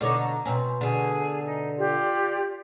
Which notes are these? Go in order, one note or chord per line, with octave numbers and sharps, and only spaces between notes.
B2 D3 D#4 C#5 C#6 D6
A#5
B2 C4 C#4
B2 D3 G#4
D#4
F4 G4 D5